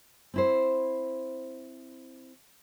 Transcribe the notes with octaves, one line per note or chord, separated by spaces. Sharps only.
C4 E4 C5